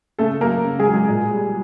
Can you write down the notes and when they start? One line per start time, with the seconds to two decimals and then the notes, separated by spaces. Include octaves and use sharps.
0.19 C#3 A3 A4
0.41 F#3 A#3 A#4
0.64 C#3
0.79 G#3 G#4
0.87 F#3
0.93 G#3 G#4
1.09 A#2
1.32 G3